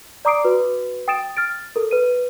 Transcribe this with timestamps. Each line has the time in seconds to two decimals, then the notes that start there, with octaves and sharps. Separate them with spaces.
0.25 D5 A#5 D6 D#6 C7 D7
0.45 F#4 B4
1.08 G5 D#6 A6 D7 E7
1.37 F6 A6 D7
1.76 A4 A#4
1.91 B4 D#7